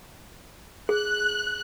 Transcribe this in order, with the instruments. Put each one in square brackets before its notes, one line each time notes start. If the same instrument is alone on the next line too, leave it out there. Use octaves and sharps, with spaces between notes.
[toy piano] G#4 [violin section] F#6